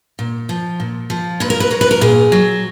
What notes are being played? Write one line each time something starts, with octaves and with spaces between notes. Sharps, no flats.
A#2
F3
A#2
F3
A#2 B4
A#4
B4
F#3 A#4
B4
A#4
A#2 G#4
F#3